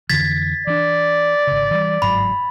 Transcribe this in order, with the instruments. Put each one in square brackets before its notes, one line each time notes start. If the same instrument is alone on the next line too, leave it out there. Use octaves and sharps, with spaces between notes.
[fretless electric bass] F2 D3 E3 [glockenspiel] G#6 A6 B6
[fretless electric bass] E3 D4 [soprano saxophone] D5
[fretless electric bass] G#1 C#3
E3 G3
[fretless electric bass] G1 G#2 F#3 [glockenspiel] B5